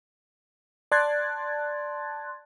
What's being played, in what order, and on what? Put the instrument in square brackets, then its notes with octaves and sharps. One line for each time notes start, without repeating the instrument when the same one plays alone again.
[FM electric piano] D5 A5 C6 F#6 G#6 A6